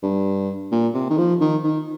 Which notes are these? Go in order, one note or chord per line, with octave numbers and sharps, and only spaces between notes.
G2
A#2
C3
D#3
F3
D#3
D#3